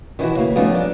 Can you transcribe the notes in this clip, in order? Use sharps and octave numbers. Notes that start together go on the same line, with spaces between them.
D#3 E3 D#4 E4 F#4
C#3 A#3
F3 G3 A3 B3 C#4 D#4
D4 D5